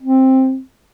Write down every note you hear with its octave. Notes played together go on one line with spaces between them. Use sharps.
C4